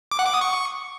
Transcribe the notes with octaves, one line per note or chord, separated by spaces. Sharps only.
D6
F#5
D6
D#6
C#6